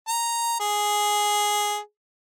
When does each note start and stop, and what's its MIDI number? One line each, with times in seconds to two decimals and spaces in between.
0.08 0.55 82
0.60 1.78 68